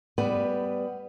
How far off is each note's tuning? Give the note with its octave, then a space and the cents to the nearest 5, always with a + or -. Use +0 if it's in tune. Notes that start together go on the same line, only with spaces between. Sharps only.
G3 +5 B3 +15 B4 +0